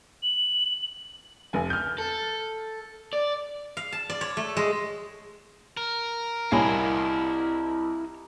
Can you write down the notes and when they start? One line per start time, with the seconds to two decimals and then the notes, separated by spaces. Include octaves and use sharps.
0.23 F#7
1.53 F1 G#5
1.70 F6 G6
1.98 A4
3.13 D5
3.77 F5
3.92 A5
4.10 D5
4.21 C#5
4.37 A3
4.57 G#3
5.77 A#4
6.52 C2 E4 C#5 D#5 F5 G#5 B5